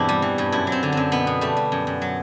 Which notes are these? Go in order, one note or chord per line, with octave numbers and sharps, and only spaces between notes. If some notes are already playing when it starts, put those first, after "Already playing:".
Already playing: E2 G2 B2 C4 D4 E4
G3
E3
G2
F#2 E4
F#3
C4
D3
F#2 C4
B2 B3
B2
G3 A3
G3
F#2
F#2
F#3